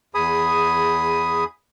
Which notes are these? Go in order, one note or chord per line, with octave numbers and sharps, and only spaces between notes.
E2 G#4 G#5 B5 D#6